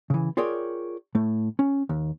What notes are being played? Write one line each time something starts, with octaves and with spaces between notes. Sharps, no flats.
C#3 E3
F4 G#4 A#4 C#5 D5 G5
A2 A3
C#4
D#2